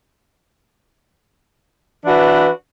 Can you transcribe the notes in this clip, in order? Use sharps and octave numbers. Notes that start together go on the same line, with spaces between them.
E3 D4 F#4 B4